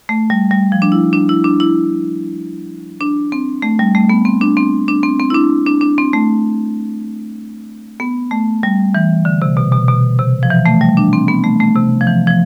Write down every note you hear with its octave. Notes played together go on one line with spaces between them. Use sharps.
A3
G3
G3
F3
D4
E4
D4
E4
D4
E4
D4
C4
A3
G3
A3
B3
C4
D4
C4
D4
C4
C4
E4
D4
D4
D4
C4
A3
B3
A3
G3
E3
D3
C3
B2
B2
B2
C3
F3
E3
A3
G3
D4
C4
B3
A3
A3
C3
F3
E3
F3